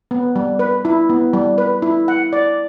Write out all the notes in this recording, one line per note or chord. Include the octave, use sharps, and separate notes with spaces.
B3
G3
B4
E4
B3
G3
B4
E4
F#5
D5